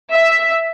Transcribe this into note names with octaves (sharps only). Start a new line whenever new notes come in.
E5